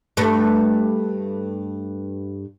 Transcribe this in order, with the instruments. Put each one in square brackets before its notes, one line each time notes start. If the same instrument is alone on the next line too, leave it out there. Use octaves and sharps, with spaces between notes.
[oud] G2 A3